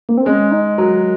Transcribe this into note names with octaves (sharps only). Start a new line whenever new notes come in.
A#3
C4
G#3 C#4
D#4
F#3 A#4